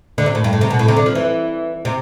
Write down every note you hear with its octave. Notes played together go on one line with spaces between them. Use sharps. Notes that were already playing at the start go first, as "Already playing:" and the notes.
D3
C3
A2
G2
A2
C3
B2
A2
C3
D3
F3
E3
C3